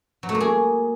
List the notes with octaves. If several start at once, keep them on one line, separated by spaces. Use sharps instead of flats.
F#3
A3
A#3
G#4